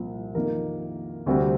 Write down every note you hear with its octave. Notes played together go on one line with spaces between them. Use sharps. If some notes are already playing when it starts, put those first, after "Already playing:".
Already playing: C2 A#2 F3
F2 D#3 A#3 A#4
D2 C3 G3 C4